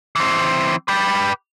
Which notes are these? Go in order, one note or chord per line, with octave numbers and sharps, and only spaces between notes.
E3 C4
G4 B4